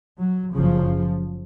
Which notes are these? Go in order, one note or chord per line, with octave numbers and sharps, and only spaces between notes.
F#3
F#1 F#2 C#3 F3